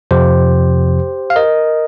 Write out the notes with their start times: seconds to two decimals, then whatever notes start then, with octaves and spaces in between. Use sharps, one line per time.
0.11 F2 C3 F3 G4 C5
1.30 F5
1.36 A#4 D#5